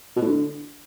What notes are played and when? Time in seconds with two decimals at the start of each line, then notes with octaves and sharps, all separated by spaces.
0.16 B2
0.22 A2
0.27 D3